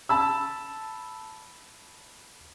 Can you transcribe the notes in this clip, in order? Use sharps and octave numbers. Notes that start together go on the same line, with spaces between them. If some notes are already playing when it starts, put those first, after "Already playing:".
A5 B5 E6